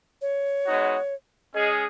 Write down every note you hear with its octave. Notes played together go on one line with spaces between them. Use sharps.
C#5
G#3 B3 D#4 F#4
G#3 C#4 G#4 D#5